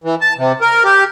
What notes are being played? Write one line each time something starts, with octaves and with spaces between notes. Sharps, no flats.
E3
A5
C3
A#4
G4